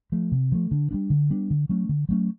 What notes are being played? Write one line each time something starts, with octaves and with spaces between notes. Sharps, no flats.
F3 A3
C3
F3 A3
D3
G3 B3 D4
D3
G3 B3 D4
D3
F#3 A3 C#4
D3
F#3 A3 C#4